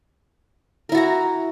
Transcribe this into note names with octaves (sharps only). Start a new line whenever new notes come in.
E4 F#4 A#4 A#5